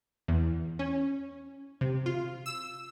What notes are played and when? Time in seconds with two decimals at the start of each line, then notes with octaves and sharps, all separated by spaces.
0.28 E2
0.79 C#4
1.81 C3
2.06 F4
2.46 E6